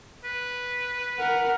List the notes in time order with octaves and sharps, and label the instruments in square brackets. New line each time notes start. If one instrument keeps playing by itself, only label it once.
[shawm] B4
[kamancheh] A#4 [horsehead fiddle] F#5